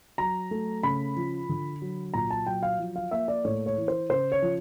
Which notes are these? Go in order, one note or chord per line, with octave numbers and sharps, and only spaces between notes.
F#3 A#5
A3
C#3 B5
F3
D3
F#3
A#2 A#5
A5
F#3 G5
F5
F3
F5
A#3 E5
D5
A2 C#5
C#5
E3
C5
C#3 C5
C#5
F3